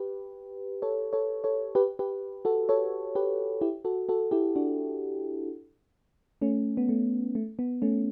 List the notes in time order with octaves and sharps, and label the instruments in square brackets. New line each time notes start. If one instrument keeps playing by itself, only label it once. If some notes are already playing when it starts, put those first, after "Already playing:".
Already playing: [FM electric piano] G4 B4
A4 C#5
A4 C#5
A4 C#5
G4 B4
G4 B4
F#4 A4
A4 C#5
G4 B4
E4 G4
F#4 A4
F#4 A4
E4 G4
D4 F#4
A3 C#4
B3
A3
A3
B3
A3 C#4